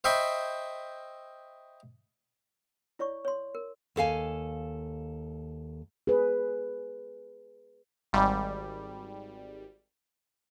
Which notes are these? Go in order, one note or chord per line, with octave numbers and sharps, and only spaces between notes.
C5 D#5 E5 G5 B5 C#6
E4 C#5 D5 C#6
C#5 C6
A#4
D#2 A4 F5 G#5
G#4 B4
G#1 G3